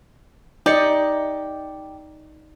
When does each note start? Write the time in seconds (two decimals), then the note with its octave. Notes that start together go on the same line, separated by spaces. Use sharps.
0.66 D#4 G4 D5 D#5 C#7